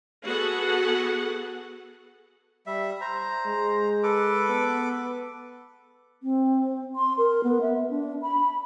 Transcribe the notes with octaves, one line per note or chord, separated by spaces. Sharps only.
B3 F#4 G#4 A4 F#5
G3 E5
C5 A#5
G#3
A4 B4 D6
B3
C4
C6
A#4
B3
E5
D4
B5